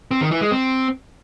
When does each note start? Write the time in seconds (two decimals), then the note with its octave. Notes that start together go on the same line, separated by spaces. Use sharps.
0.11 C4
0.21 D#3
0.31 E3
0.41 G#3
0.51 C4